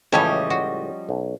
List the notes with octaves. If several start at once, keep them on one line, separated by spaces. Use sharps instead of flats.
C#2 A2 E3 F3 G3 C#4 C#5 D#5
F#4
B1